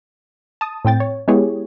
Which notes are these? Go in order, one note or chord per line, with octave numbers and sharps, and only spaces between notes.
A5 D#6
A2 C4 G5 A6
C#5
G#3 B3 E4 G4 G#4 C#5